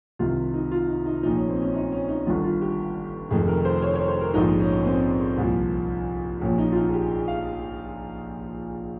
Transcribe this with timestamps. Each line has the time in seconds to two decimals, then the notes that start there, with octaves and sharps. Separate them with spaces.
0.19 C2 C3 D#3 F4
0.54 D#4
0.71 F4
0.88 D#4
1.06 D#4
1.23 A#1 A#2 F3 D#4
1.36 C#4
1.49 C4
1.62 C#4
1.75 D#4
1.92 C#4
2.09 D#4
2.27 G1 G2 D#3 F4
2.44 F4
2.62 G4
3.31 F1 F2 D#3 G#4
3.48 A#4
3.65 C5
3.82 C#5
3.95 C#5
4.08 C5
4.21 A#4
4.34 A#1 G#2 F3 D#4
4.60 C#4
4.86 C4
5.38 C2 A#2 F3
6.41 A#1 A#2 F3 C#4
6.58 D#4
6.72 F4
6.76 D#4
6.89 G#4
6.93 G4
7.11 G#4
7.28 F5